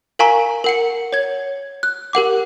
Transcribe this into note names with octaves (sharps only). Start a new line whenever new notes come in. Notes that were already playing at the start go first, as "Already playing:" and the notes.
A#4 F5 G#5 A#5 C#6 B6
A#4 F#5 C#7
C#5 G#6
F#6
G4 A#4 F#5 D6